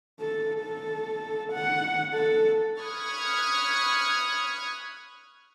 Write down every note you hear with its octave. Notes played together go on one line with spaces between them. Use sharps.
A4
A4
F#5
A4
B5 C#6 D#6 F6 F#6 G#6